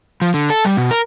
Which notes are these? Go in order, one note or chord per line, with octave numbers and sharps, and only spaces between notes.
F3
D3
A4
G3
B2
A#4